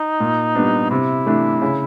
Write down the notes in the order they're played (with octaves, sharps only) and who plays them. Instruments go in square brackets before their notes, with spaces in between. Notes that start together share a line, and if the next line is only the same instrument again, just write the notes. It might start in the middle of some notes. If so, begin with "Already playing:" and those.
Already playing: [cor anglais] D#4
[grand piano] A#2
G3 B3 D4
[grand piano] C3 [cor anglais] E4
[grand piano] E3 A3 D4
C#3